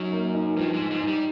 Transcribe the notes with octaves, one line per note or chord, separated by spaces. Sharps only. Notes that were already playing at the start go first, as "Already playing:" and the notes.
Already playing: F#2 F#3 D#4
A#3
D#4
G2 F3 G3
G#2 G#3
D#4
G#2 G#3
D#4
G3